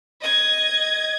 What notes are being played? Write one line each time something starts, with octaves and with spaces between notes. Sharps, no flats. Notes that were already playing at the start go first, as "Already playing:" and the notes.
D#5 G#6